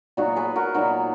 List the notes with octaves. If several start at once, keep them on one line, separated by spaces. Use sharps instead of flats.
A#2 F#3 B3 D#4 F#4
G#4 B4
F#4 A#4
A#2 F#3 B3 D#4 F#4